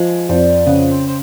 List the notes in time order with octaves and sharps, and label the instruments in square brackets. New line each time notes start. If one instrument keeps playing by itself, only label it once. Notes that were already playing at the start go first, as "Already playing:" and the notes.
Already playing: [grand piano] F3 [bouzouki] G#3
[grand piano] F2 [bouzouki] G3
[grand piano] C#3 [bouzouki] B3
[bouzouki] C4
C4